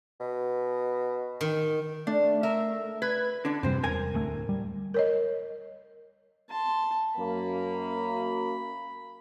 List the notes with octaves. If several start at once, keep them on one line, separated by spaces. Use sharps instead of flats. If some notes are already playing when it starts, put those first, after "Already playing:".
B2
D#3
A3 D4
A#4 E5
B4 G#6
D3 D4
F#2 C3 G3 C4 C5
E1 A#4 G#5
D1 D2 A3
G3
A#4 C#5 D#5
A5 C6
F#2 A#3 B5